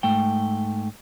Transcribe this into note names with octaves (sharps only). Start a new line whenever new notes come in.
G#2 A3 G5